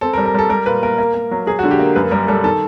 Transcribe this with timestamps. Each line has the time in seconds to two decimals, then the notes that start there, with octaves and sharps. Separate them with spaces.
0.01 C4 A4
0.13 A#4
0.18 G3
0.26 A#4
0.34 G3 A4
0.49 G3 A#4
0.66 A#2 B4
0.83 A#3 A#4
0.98 A#3
1.14 A#3
1.31 F#3
1.46 F#3 G#4
1.59 F#4
1.64 D3
1.71 G4
1.79 A#3
1.96 F#2 B4
2.11 G3 A#4
2.28 G3 A4
2.44 D#3 A4